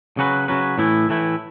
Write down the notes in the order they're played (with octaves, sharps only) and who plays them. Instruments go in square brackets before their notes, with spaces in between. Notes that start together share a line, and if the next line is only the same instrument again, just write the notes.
[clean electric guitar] C#3 F#3 C#4 F#4 B4
C#3 F#3 C#4 F#4 B4
A2 E3 A3 E4
A2 E3 A3 E4